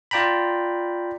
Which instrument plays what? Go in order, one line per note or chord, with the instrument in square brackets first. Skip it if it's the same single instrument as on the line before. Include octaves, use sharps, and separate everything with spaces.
[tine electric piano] F4 D5 G5 A#5 B5